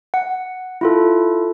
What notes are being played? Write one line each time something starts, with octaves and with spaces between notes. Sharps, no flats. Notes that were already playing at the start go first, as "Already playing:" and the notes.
F#5
E4 F4 A4